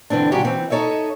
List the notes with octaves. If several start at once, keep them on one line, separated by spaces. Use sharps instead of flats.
G2 D3 E3 C4 D4
A#2 C#3 F#3 D4 F#4 G4
E3 C4
D#4 A4 C#5 D#5 E5